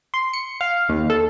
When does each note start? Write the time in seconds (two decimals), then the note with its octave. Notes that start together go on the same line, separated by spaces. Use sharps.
0.14 C6
0.33 C#7
0.61 F5
0.89 D#2
1.10 A4